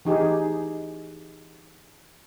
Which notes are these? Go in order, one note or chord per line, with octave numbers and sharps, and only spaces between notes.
E3 D#4 G4 G#4